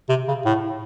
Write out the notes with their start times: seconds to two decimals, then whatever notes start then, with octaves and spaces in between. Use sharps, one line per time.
0.09 C3
0.28 C#3
0.45 A2